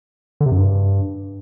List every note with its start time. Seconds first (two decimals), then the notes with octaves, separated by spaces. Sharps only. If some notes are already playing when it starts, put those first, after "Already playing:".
0.41 D3
0.46 C3
0.51 F#2
0.57 G2